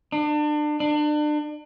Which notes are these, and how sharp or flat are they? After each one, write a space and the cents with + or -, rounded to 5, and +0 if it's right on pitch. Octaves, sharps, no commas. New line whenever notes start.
D4 +30
D4 +35